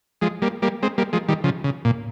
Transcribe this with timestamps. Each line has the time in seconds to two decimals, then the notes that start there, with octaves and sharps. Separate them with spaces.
0.21 F3 G#3
0.42 G3 A#3
0.62 G3 A#3
0.83 G#3 C4
0.98 G3 A#3
1.13 F3 G#3
1.28 D#3 G3
1.44 C#3 F3
1.64 C#3
1.85 A#2